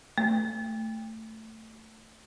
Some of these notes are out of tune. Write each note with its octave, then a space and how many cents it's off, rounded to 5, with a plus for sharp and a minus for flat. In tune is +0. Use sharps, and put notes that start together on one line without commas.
A3 +10